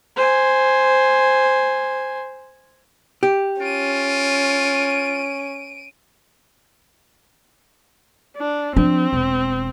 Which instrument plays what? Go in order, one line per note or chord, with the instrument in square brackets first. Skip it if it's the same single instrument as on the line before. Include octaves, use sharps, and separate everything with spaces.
[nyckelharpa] C5 G#5
[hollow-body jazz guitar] G4
[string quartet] C#4 [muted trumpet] F4 [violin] D7 D#7
[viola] D4
[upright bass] F3 D4 [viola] C4
[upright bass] E1